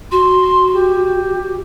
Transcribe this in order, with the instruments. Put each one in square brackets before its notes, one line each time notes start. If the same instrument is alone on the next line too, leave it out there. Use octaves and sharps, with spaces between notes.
[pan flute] F#4 [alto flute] C6
[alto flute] G4